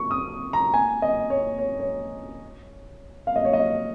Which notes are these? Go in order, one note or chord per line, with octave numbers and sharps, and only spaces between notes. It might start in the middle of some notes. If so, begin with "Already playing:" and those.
Already playing: C#6
D#6
A#5
G#5
D#5
C#5
C#5
C#5
F5
D#5
C#5
D#5